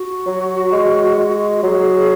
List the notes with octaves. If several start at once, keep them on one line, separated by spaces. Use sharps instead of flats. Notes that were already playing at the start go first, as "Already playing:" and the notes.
Already playing: F#4
F#3
G#3
G#3
F#3 G#4